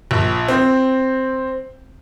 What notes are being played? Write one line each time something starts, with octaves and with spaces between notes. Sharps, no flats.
A#1
C4